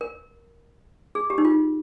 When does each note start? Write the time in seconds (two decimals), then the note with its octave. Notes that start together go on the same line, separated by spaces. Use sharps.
0.01 A#4
1.15 G#4
1.30 G4
1.38 D#4
1.45 F4